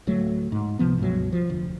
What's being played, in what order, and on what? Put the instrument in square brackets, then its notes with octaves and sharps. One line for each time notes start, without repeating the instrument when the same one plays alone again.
[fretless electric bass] D1 D2 F#3 A3
G#2
C#2 C3 F3 B3
C#2 G2 B2 F#3
F3
F1 D2